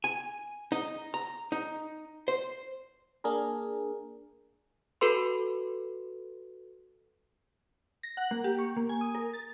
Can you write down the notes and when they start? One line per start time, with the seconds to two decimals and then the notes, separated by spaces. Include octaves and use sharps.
0.04 G#5
0.72 D#4
1.14 A#5
1.52 D#4
2.28 C5
3.24 A#3 D4 G#4 A#4
5.01 F#4 A4 B4 C6
8.03 A#6
8.17 F#5
8.31 A#3
8.44 G4
8.59 C#6
8.77 A#3
8.89 G#5
9.01 D#6
9.15 A#4
9.33 A6